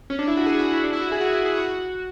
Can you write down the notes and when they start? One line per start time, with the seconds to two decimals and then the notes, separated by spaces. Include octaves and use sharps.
0.10 C#4
0.19 D4
0.28 E4
0.37 F#4
0.46 G#4
0.59 F#4
0.72 E4
0.84 D4
0.93 E4
1.01 F#4
1.12 G#4
1.21 F#4
1.33 E4
1.46 G#4
1.57 F#4